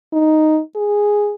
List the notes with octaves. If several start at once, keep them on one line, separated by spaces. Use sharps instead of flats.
D#4
G#4